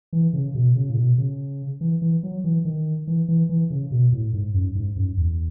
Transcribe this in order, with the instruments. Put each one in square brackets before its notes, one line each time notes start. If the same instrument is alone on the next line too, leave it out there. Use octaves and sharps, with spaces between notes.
[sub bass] E3
C#3
B2
C#3
A2
B2
C#3
E3
E3
F#3
E3
D#3
E3
E3
E3
C#3
B2
A2
G#2
F#2
G#2
F#2
E2